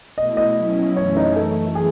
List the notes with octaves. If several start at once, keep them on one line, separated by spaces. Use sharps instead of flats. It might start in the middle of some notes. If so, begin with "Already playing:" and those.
B2 A3 E4 D#5
D#5
B2 F#3 C#4 E4
F#2 E3 A3 C#4 E4 C#5
D#4
F#2 E3 A3 A4
G#4